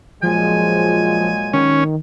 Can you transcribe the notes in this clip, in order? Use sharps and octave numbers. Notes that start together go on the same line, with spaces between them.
A#2 F3 F#3 G#3 G#5
D#3 C#4